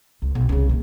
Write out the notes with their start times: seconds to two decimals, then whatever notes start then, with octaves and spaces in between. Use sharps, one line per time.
0.22 C#2
0.35 B1 G2
0.49 C2 C#3
0.69 D#3 A#3